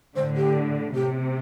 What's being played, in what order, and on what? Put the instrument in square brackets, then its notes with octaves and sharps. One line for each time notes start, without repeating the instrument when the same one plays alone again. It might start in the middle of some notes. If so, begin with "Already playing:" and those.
[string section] A2 D3 [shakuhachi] C5
[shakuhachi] G4
[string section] C3 [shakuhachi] G4